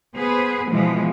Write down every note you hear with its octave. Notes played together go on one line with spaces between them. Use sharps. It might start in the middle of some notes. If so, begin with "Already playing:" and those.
B3 G#4 B4 C5
B2 E3 F3 G#3